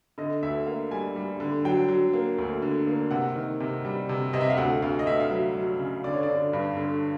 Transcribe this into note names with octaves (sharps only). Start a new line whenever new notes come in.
D3 D#5
D2 E5
A#3 F5
G3 G#5
G3
D3
F#3 G5
F#3
A#3
D2
D3
A#3
C3 F#5
D#3
C3
G3
C3
C3 D#5
E5
F5
D2 F#5
D2 F5
D#5
D2 E5
F5
F#3 E5
F#3
C#3
D3 D5
C#5
D5
D3
G2
D3